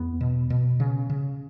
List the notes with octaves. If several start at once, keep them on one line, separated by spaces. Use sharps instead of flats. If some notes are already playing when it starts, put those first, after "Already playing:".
Already playing: E2 B3
B2
B2
C#3
C#3